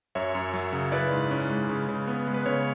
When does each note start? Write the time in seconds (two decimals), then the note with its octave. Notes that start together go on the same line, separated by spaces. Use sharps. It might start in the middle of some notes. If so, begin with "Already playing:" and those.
0.15 F#2 C#5 E5
0.35 F#2
0.54 F#3
0.73 C#3
0.92 E4 B4 D5
1.12 G#2
1.31 C#4
1.50 G#3
1.69 C#3
1.88 C#3
2.08 B3
2.27 G#3
2.34 B4
2.46 C#3 C#5